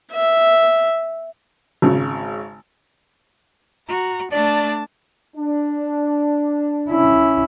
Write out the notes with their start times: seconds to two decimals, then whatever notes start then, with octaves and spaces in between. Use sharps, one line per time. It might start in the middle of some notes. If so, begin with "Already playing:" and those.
0.13 E5
1.82 G#1 C#3
3.88 F#4 A#5
4.32 A3 D4 D5 A5
5.37 D4
6.90 C#4 E4